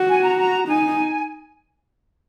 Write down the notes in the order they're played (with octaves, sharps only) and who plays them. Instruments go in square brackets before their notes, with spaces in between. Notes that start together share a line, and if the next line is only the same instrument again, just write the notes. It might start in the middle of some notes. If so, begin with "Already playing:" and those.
Already playing: [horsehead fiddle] F#4
[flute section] G#5
A#5
A#5
[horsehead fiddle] D#4 [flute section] G#5